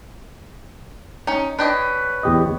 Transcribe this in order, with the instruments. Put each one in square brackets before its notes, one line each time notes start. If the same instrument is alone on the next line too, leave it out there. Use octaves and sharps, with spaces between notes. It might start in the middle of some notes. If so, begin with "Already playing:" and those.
[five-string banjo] C#4 D#4
[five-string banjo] D4 G4 D#5 [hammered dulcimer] B4 C#5
[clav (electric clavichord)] E2 G4 D#5